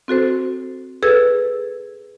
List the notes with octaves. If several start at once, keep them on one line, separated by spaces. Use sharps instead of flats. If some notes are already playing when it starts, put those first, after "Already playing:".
C4 F#4 A4 C5
G#4 A4 B4 E6 G#6